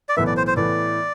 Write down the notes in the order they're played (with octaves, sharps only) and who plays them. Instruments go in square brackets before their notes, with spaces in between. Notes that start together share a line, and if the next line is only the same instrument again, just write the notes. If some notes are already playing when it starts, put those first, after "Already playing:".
[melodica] D5
[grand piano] B1 A2 E3 B3 [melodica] E5
[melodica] D5
C5
C5
[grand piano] A2 E3 B3 [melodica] D5